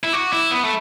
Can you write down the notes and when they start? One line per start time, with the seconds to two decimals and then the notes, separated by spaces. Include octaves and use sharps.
0.04 E4
0.12 F#4 D6
0.33 E4
0.51 B3 B5
0.63 A3